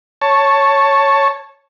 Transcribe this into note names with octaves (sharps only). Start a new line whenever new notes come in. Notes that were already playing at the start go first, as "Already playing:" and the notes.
C#5 A5